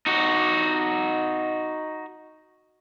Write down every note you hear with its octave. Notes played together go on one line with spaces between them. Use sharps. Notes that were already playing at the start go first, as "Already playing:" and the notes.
D#4 F#4